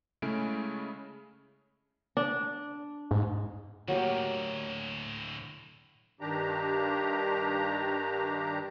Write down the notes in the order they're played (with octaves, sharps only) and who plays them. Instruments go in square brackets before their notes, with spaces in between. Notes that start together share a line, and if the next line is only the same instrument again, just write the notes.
[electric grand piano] C#3 G#3 A3 C#4 E4 D7
[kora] D4
[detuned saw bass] G#2
[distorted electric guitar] D2 A2 [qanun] F#3 A#3 G4
[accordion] G2 D#3 D4 G4 A#5